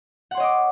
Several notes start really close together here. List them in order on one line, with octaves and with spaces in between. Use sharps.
F#5 C6 C#5 D#5 D6